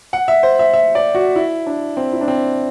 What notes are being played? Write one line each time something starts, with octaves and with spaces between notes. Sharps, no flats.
F#5
E5
C5
E5
E5
D5
F#4
E4
D4
C4
E4
D4
C4